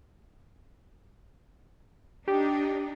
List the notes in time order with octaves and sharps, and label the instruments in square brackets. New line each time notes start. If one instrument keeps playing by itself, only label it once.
[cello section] D4 D#4 [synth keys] G4